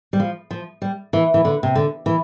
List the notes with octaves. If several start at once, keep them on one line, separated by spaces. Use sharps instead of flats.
G3
F3
F3
G3
E3
E3
D3
C3
D3
E3